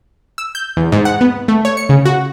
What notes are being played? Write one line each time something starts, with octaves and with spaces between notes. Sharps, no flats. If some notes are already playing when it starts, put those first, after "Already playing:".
E6
G6
E2
G#2
F#5
B3
A3
C#5
C#7
C#3
F#4